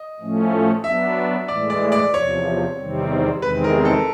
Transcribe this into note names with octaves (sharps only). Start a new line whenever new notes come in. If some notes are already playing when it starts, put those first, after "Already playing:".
Already playing: D#5
A2 F3 A3 C#4
F#3 B3 D4 E5
A2 E3 G#3 D5
D5
D5
E2 C3 F3 C#5
E2 C3 D#3 G3 C4
E2 C3 D#3 G#3 C4 B4
A#4
A4